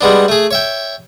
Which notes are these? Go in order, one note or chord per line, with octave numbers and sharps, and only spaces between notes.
G3 G#3 B3 D4
A3 G#4
C#5 E5 G5